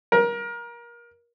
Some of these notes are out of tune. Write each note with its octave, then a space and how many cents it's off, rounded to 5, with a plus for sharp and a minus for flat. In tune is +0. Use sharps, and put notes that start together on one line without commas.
A#4 +25